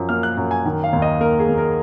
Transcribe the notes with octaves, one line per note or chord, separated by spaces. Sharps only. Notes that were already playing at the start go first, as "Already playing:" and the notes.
Already playing: F#2 F3
A#3 F6
F#6
F#2
G#5
D#3
F5
D#2
D#5
A#3 A#4
G#4
D#2
A#4